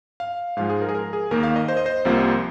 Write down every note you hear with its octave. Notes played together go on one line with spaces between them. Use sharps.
F5
G#2 F3 G#3 F5
G#4
A#4
G#4
A#4
G#4
D#2 D#3 A#3 A#4
F5
D#5
C5
D#5
C5
C2 C3 F3 A#3